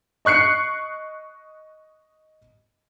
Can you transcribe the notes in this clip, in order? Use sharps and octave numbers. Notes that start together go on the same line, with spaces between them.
D#5 C#6 F#6 C7 C#7